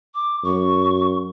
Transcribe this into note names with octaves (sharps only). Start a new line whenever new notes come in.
D6
F#2 C#6